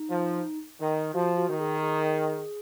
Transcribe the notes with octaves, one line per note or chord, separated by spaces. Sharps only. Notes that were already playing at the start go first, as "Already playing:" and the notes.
Already playing: D#4
F3
D#3
F3 F#4
F#4
D#3
G#4
G#4